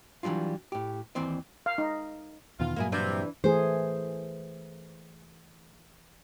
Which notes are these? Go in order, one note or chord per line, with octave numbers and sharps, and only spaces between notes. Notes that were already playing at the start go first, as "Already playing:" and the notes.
E3 F#3 G3 D4 F4
A2 G4
D#2 E3 C4 C5 D5
F5
D#4
E2 B2 D#3 F4
G2 A#2 F#3 A#3 E4 G#4
C3 E3 D4 B4
E3 A3 G#4 C5